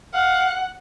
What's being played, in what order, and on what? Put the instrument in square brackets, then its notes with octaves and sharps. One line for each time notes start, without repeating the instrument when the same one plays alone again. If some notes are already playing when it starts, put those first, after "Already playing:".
[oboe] F5 [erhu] F#5